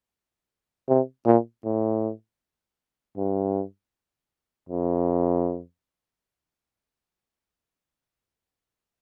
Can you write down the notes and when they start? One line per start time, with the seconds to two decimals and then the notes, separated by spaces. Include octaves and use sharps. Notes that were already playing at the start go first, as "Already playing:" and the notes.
0.89 C3
1.26 A#2
1.65 A2
3.17 G2
4.69 F2